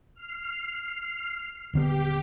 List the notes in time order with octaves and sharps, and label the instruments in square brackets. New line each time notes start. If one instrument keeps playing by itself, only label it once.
[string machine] F6 C7
[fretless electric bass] D#1 D3 B3 [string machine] G4